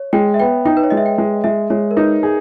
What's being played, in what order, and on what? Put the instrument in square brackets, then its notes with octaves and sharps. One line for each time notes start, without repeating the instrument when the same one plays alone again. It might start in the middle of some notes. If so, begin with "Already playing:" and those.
Already playing: [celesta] C#5
[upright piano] G#3 [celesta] G5
[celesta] E5
[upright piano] B3 [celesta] G5
[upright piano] D#4 [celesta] G5
[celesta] B4
C#5
[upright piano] G#3 [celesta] D#5
[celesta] E5
G5
[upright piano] G#3
[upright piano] G#3 [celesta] E5
[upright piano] G#3 [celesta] C#5
[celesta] A#4
[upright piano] D#4 [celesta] B4
[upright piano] G#4